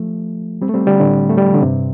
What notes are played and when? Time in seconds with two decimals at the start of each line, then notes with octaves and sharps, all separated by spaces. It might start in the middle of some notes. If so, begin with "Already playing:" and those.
Already playing: F3 A3
0.61 G3 C4
0.69 A3
0.74 G3 C4
0.87 D3 G3
1.00 A2 D3
1.29 A3
1.37 G3
1.46 F3
1.54 D3
1.62 G2 C3